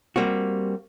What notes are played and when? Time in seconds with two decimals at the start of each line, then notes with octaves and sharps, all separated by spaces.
0.16 G3 A#3 C4 F#4